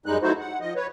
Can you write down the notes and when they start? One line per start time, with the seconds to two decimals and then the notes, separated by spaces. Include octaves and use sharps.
0.06 F#2 G3 G#3 D#4 F#6
0.22 F#3 A3 D#4 E4 F#4 C5
0.40 F#5
0.61 F3 D#5
0.76 B4 C#5